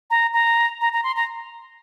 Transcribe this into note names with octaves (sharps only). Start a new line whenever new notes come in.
A#5
A#5
A#5
A#5
C6
A#5